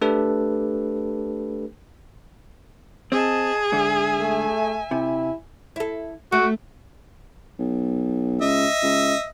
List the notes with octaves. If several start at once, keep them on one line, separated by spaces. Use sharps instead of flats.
A3 D4 G4 A4 B4
C4 G#4 D#5 A5
G#2 D3 E5 G#5
A3
C3 E4
E4 A4
A3 F#4
B1
C#2 D#5 E5
C#2